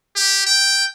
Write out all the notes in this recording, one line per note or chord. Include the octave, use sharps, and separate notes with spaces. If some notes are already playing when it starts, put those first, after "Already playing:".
G4
G5